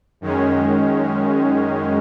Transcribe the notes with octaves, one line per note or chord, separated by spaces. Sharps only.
F#2 D#3 G#3 C#4